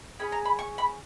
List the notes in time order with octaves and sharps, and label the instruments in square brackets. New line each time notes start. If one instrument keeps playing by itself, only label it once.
[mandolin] C#4 G#4 B5
A#5
B5
C#6
B5